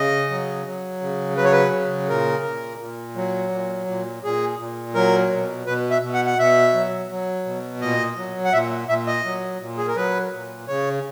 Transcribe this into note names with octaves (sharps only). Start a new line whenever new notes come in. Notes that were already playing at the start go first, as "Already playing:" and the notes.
Already playing: C#3 D#5
F#3
F#3
C#3
F#3 B4
C#5
B4
C#3
A#2 A#4
A#2
A#2
F#3
A#2
A#2
A#2 G#4
A#2
F#3 A#4
B2
B2 B4
E5
B2
F#5
F#5
B2 E5
F#3
F#3
B2
A#2 D#5
F#3
F#5
A#2 E5
A#2 E5
D#5
F#3
A#2
G#4
A#4
F#3 B4
A#2
C#3 C#5